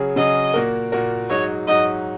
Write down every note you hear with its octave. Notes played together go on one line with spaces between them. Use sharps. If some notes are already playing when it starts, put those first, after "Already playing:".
Already playing: C#3 F#3 C#4 G#4
C#3 F#3 C#4 G#4 D#5
A#2 A#3 F#4 A#4
A#2 A#3 F#4 A#4
G#2 F#3 D#4 F#4 C#5
G#2 F#3 D#4 F#4 D#5